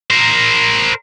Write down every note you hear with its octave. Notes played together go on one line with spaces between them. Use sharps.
A#4 C5